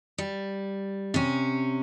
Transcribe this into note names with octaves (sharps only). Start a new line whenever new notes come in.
G3
C3 C#4